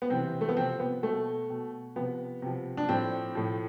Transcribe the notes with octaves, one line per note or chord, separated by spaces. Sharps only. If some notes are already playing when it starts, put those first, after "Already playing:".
B3
C3 E3 C4
A3
B3
C3 F3 C4
B3
B2 A3
B2
C3 F3 B3
C3 F3
D4
A2 F3 C4
A2 F3